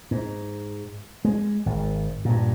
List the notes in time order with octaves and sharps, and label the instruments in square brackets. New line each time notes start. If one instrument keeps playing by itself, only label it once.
[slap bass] G#2
G#3
G#1
G2 A#2